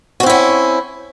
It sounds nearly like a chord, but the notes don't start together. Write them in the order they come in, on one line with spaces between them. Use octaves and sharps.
F#4 C4 E4 C#4